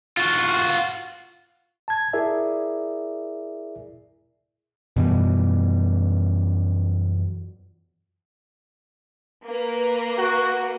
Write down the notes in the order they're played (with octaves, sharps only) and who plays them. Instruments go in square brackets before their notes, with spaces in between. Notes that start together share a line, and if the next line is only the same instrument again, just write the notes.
[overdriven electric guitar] F4 F#4
[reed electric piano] A5 G#6
E4 G#4 A#4 D5 E5
[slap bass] F#2 B2 E3 G3
[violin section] A#3 B4
[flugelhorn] F#4